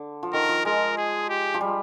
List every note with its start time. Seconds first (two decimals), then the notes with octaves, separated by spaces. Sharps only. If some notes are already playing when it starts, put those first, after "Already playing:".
Already playing: D3
0.23 F3
0.33 D#3 A#4
0.49 F3
0.65 G#3 A#4
0.97 G#4
1.29 G4
1.54 F3
1.61 G3